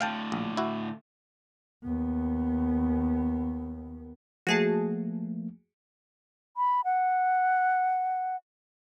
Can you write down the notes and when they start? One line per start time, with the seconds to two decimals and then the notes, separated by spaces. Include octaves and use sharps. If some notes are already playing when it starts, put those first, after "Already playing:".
0.01 A2 D3 F5 G5 A5
0.32 A#1
0.57 E4 F#4
1.84 D#2 B3
4.47 F3 A3 A#3 F#4 G#4 A5
6.57 B5
6.85 F#5